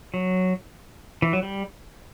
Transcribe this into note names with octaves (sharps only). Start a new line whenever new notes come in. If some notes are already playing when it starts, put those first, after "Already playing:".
F#3
E3
F#3
G3